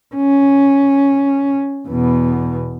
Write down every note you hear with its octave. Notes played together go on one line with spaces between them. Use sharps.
C#4
E2 B2